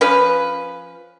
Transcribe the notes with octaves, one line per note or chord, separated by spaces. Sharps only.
F3 C#4 B4